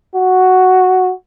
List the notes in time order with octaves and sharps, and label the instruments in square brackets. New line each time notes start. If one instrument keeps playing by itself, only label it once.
[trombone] F#4